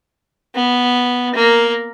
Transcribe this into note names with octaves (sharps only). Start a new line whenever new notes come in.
B3
A#3